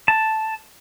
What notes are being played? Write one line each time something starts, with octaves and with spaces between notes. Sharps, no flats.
A5